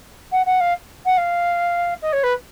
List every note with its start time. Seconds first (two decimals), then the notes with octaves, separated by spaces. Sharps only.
0.32 F#5
0.46 F#5
0.60 F5
1.05 F#5
1.17 F5
2.01 D#5
2.12 C#5
2.23 B4